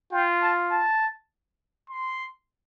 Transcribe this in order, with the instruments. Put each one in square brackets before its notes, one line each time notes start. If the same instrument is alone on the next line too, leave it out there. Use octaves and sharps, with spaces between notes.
[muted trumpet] F4 [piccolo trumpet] G5
[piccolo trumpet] A5
A5
C6